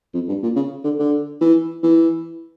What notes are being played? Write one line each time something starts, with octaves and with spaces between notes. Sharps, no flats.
F2
G2
A#2
C#3
D3
D3
E3
E3